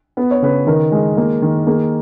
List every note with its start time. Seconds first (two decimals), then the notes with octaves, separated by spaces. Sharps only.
0.17 B3 B4
0.31 C#5
0.42 C#3 B4
0.67 D#3 A#4
0.92 G#3
1.17 A#3
1.42 D#3
1.66 A#3 G#4